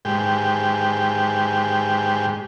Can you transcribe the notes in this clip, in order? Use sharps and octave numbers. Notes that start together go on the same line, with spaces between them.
G#2 G4